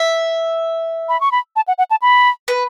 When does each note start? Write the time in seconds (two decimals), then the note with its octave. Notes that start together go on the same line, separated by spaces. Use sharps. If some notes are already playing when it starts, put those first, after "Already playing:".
Already playing: E5
1.09 B5
1.21 C#6
1.32 B5
1.56 A5
1.68 F#5
1.78 F#5
1.91 A5
2.02 B5
2.48 B4